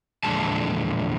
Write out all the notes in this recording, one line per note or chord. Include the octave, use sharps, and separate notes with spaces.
E2 A#2 D3 F3 G#3 A5